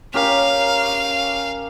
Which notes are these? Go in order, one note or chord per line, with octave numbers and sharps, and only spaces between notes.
C#4 G4 A#4 F5